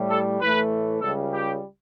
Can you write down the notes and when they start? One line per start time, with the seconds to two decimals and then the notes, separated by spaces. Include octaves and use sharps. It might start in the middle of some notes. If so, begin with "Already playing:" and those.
Already playing: A2 G3
0.10 A4
0.41 A2 E3 A3 B4
1.02 C#2 C#3 G3 A4
1.33 G4